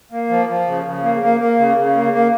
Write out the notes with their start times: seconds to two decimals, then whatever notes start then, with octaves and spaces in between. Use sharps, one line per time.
0.12 A#3
0.29 F3
0.49 F3
0.67 C#3
0.86 C#3
1.03 A#3
1.22 A#3
1.40 A#3
1.59 C#3
1.77 C#3
1.96 A#3
2.14 A#3